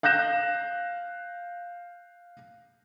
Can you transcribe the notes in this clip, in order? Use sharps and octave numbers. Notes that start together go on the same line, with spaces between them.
F5 F#6 G6 A#6 E7